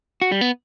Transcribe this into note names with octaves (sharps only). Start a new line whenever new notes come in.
F#4
G3
B3